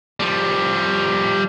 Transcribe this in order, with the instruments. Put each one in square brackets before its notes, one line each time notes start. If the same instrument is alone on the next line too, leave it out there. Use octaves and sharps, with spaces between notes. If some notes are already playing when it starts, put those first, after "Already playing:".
[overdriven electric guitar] F3 G3